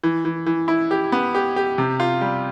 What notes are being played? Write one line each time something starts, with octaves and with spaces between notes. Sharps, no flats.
E3
E3
E3
E4
G4
B3
G4
G4
C3
F4
G3